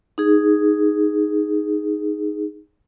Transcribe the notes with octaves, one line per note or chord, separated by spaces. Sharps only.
D#4 G#4